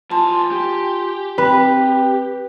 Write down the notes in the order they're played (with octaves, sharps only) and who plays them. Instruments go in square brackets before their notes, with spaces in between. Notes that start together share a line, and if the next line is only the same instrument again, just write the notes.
[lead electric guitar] E3 A5 [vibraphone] F4 G#5 C6
[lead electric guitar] G4
[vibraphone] C4 G5 [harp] B4